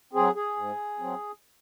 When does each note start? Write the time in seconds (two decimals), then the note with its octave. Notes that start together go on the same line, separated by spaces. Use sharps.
0.13 F#3 C4 G#4
0.35 G#4
0.57 G#2
0.99 F#3 C4